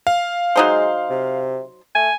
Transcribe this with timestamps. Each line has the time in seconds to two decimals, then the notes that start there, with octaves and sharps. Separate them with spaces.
0.07 F5
0.56 F#3 G#3 D#4 C5
1.09 C3
1.95 A3 G#5